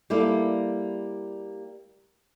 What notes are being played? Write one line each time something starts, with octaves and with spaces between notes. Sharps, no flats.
G3 A#3 E4 A4 D5